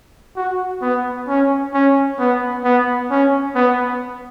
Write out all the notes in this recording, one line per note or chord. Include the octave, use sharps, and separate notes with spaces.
F#4
B3
C#4
C#4
B3
B3
C#4
B3